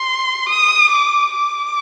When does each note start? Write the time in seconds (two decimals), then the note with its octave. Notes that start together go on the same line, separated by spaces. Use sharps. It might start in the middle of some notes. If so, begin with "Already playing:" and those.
Already playing: C6
0.49 D#6
0.90 D6
1.31 D6